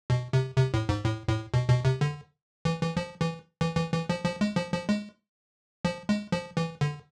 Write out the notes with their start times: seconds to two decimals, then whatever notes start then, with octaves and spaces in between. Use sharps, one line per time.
0.10 B2
0.33 C3
0.57 C3
0.74 A2
0.89 G#2
1.05 A2
1.29 A2
1.54 B2
1.69 B2
1.85 C3
2.01 D3
2.65 E3
2.81 E3
2.97 F3
3.21 E3
3.61 E3
3.76 E3
3.93 E3
4.09 F3
4.25 F3
4.41 G#3
4.56 F3
4.72 F3
4.89 G#3
5.85 F3
6.09 G#3
6.32 F3
6.57 E3
6.81 D3